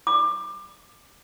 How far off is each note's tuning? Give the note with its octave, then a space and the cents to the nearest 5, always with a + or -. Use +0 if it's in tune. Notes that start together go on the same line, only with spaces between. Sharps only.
D6 +25